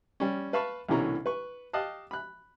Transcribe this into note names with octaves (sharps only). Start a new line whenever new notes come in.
G3 C#4
B4 F5 A5 B5 C#6
C2 B2 D3 E3 C#4 A#5
B4 C#6
G4 D#5 F5 A5 F#6
B5 F#6